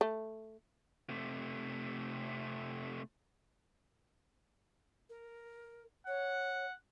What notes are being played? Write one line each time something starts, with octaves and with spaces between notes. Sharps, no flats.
A3
C3 A3
A#4
C#5 F#5